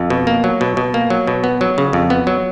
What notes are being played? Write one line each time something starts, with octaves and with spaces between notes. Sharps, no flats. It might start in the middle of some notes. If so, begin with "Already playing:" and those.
Already playing: F2
B2
A#3
F#3
B2
B2
A#3
F#3
B2
B3
F#3
C#3
F2
B3
F#3